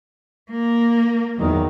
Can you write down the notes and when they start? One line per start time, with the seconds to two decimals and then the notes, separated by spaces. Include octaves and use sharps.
0.51 A#3
1.37 E2 D#3 F#3